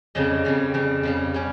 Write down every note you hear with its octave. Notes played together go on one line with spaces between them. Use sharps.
F2 C#3 G3 D#5
F2 C#3 G3
F2 C#3 G3
F2 C#3 G3
G3 C#4